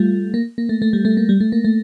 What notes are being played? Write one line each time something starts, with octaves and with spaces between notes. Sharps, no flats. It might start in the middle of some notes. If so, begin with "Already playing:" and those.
Already playing: G3 A3 F4
A#3
A#3
A3
A3
G3
A3
A#3
G3
A3
A#3
A3